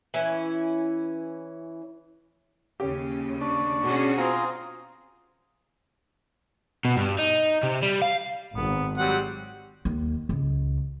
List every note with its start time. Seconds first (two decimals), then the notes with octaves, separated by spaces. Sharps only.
0.14 E3 C#4 E4
2.80 D#2 C#3 C#4 G4
3.41 D4 C#6
3.84 B2 C#4 F#4 G#4
4.18 C4 F4 G#5 A#5 C6 D#6
6.85 B2
6.96 G2
7.19 D#4
7.63 C3
7.82 G3
8.02 F5
8.56 G#1 B3
8.98 F#3 G3 C4 F#5
9.85 D#2
10.29 C#2